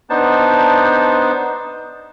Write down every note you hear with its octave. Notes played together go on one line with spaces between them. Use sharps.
B3 D4 D#4 C5 A5